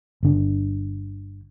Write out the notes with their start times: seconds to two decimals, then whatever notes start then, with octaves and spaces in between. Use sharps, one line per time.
0.23 G1 D3